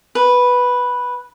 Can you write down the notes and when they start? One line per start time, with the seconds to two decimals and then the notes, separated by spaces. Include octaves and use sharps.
0.15 B4